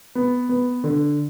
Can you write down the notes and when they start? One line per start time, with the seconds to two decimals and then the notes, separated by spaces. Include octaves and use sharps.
0.15 B3
0.49 B3
0.84 D3